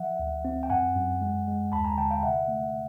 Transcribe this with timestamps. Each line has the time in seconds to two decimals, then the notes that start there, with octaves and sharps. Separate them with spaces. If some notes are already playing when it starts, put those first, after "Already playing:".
Already playing: F3 E5 F#5
0.19 D2
0.45 C4
0.63 G5
0.70 F#2 F#5 G#5
0.95 F#2
1.22 G#3
1.47 G#3
1.72 D#2 A5 B5
1.85 G#5 A#5
1.97 D3 G5 A5
2.11 F5 G5
2.23 C3 E5 F#5
2.48 A3